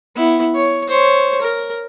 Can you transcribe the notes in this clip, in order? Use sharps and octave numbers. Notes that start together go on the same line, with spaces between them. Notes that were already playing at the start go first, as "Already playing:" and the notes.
B3 E4
C#5
C5 C#5
A#4